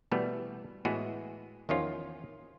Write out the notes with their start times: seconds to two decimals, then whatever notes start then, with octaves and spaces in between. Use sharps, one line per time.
0.11 B2 E3 G3 A3 B3
0.85 A2 E3 G#3 B3 F#4 G#4
1.69 E2 D#3 F3 C#4 F4